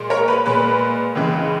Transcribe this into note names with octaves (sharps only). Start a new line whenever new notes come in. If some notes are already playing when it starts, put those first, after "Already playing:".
Already playing: A#2 G#3
A#4 C#5
B4
A#2 G#3 B4
C#2 C#3 E3 G#3